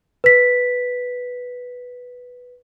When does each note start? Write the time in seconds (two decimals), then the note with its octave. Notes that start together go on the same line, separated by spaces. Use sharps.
0.24 B4 B6